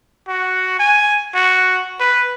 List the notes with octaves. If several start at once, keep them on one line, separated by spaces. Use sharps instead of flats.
F#4
G#5
F#4
B4